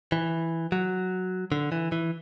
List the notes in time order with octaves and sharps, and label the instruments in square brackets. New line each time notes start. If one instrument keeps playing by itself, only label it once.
[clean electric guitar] E3
F#3
D3
E3
E3